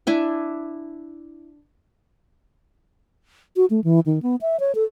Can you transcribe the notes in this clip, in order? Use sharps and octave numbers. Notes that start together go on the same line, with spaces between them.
D4 E4 G#5
F#4
A3
E3
D#3
B3
E5
C#5
A4